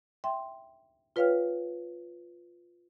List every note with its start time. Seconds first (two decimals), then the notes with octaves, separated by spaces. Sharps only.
0.24 E5 G5 C6
1.16 F4 B4 C#5 F5 G5 F6